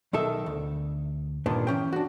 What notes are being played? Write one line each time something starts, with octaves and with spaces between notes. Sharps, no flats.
B1 D#3 A4 E5
D2
G2 A#2 D#3 B3 D4
E3 C#4 G5
D4 F#4